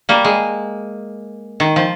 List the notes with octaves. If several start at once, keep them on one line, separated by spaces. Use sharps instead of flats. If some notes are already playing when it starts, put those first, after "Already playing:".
G3 A#3
G#3
D#3
F3